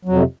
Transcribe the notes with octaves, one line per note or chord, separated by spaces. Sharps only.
F2 C3 F#3